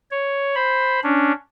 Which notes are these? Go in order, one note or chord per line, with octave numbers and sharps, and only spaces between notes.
C#5
C5 B5
C#4 D4